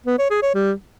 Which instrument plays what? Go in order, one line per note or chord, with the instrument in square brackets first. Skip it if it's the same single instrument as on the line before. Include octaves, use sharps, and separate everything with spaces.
[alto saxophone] B3
C#5
G#4
C#5
G3